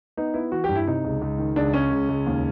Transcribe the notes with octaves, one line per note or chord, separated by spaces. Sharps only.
B3 D#4
B3 E4
E3 F#4
G2 G4
E4
C3 D#4
C#2
C#2
D#3
C#2 D4
G#3 C#4
C#2
C#2
D#2